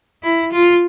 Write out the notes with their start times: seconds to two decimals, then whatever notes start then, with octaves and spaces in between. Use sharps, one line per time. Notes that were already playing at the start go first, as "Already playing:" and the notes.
0.23 E4
0.52 F4